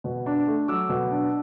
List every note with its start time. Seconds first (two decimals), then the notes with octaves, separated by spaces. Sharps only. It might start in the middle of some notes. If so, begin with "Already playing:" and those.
0.04 B2
0.26 D4
0.47 A3
0.68 F#3 D6 E6
0.89 B2
1.11 D4